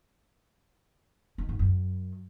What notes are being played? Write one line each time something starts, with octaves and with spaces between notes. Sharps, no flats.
D#3
G#2
F#2